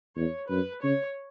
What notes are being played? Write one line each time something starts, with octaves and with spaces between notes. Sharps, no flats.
E2 C#5
F#2 B4
C#3 C#5